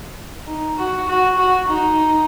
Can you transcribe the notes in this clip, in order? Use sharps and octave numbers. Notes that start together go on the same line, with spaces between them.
D#4
F#4
F#4
F#4
D#4